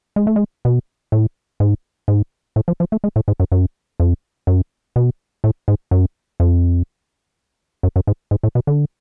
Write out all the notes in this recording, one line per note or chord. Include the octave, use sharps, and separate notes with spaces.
G#3
A3
G#3
B2
A2
G#2
G#2
A2
F3
F3
A3
G#3
A2
G#2
F#2
F#2
F2
F#2
B2
A2
G#2
F#2
F2
F#2
F#2
G#2
G#2
A2
B2
D3